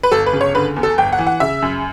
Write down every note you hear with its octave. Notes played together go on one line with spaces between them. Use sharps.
B4
G1 A4
B4
C#3
C#5
D3 B4
E2
A4
G1 G5
F#5
E3
F#5
C#3 E5
F#2